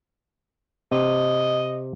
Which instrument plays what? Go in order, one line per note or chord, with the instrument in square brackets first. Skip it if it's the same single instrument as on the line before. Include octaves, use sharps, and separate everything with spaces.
[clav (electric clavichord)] C3 [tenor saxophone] D#5